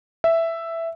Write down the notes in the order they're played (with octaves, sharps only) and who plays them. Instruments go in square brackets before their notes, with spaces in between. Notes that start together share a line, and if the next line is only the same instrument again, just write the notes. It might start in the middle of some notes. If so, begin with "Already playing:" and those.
[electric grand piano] E5